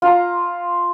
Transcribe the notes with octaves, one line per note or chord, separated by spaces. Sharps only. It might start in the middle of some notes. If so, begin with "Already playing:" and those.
F4 A#5